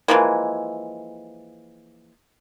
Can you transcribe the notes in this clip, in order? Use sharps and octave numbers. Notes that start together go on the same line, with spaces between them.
E3 F3 G#3 A#3